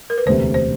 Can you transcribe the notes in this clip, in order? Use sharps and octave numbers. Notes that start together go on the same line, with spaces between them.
A#4
B4
E1 D2 C3 C5
C5